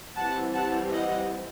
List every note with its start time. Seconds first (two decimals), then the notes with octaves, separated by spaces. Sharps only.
0.16 E3 G3 C4 F#5 A5
0.54 F#5 A5
0.91 D#5 F#5